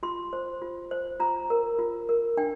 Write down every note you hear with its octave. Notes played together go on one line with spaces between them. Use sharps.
F4 C6
C5
F4
C5
F4 A#5
A#4
F4
A#4
D4 G5